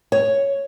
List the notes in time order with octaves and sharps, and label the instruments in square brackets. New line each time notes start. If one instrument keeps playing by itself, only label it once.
[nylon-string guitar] C#5